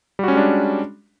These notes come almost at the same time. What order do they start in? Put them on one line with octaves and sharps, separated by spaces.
G3 F#4 C#4 G#3 D4